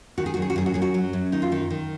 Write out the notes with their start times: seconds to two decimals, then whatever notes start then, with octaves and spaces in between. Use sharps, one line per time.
0.18 D#3 F#4
0.26 G#4
0.34 F#4
0.37 F#2
0.42 G#4
0.50 F#4
0.56 F#2 G#4
0.66 F#4
0.74 F#2 G#4
0.82 F#4
0.94 F#3
1.13 F#2
1.32 D#3 D#4
1.42 F4
1.52 D#3 D#4
1.70 D#3